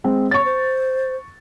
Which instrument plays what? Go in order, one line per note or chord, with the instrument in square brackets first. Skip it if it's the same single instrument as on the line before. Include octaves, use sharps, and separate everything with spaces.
[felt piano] G#3 C4
[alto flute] C#5 [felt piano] C#6 A6
[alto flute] C5